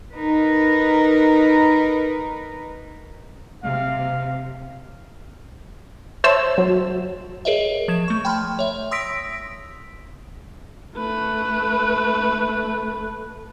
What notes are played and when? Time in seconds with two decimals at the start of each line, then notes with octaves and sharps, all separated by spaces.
0.14 D#4 A#4 B4
3.63 C3 F5
6.24 C5 C#5 E5 A5 E6
6.58 F#3
7.45 G#4 A#4 B4 C#5 D#5 E5
7.88 F3 G#6 E7
8.08 A3 C#6
8.25 G5 A5 B5 C6 F6
8.59 C#5 E5
8.91 C6 D#6 E6 A#6 B6 D7
10.96 A3 B4